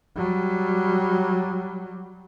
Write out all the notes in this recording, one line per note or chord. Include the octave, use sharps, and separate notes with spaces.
F#3 G3